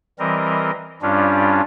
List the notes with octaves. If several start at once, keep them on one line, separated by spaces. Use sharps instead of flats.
E3 G3 C4 A#4 D#5
G2 G3 C#4 D4 F4